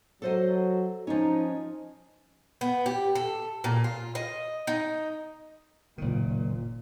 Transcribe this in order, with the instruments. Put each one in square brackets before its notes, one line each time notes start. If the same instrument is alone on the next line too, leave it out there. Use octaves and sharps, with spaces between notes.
[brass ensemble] F#3 [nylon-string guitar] A4 C5 D#5
[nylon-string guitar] F3 C#4 [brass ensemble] D#4
[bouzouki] B3
G4
A4
A#2
F4
D#5
D#4
[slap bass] F#1 D#3 [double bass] A#2